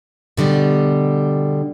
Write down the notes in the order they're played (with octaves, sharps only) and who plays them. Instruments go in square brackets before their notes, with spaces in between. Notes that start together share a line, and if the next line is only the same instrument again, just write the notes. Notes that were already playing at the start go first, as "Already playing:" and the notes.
[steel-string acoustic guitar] B2 D3 G3 G4